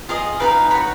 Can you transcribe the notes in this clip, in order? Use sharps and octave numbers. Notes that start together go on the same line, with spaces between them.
F4 G#4 D#5 F5
D#4 F#4 B4 F5
F#4 C#5 B5